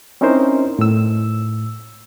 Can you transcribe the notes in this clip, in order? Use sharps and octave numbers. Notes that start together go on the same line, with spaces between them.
C4 C#4 D#4 E4 A#4 C5
A2 E6